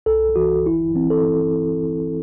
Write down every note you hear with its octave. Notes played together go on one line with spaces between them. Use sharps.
C2 A4
E3 F#4
G1 E4
E3 C4
A4